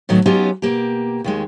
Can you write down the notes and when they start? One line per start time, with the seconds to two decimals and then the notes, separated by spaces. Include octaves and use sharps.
0.09 A2 D#3 F#3 A3 B3
0.26 F#3 B3 C#4 D#4 F4 G4
0.62 B2 A#3 G4
1.24 D#2 D#3 G#3